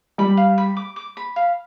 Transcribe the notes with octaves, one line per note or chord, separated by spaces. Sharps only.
G3 B5
F5
B5
D6
D6
B5
F5